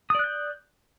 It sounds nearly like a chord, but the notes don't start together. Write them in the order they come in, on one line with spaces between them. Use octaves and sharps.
D#6 D5 F#6 G6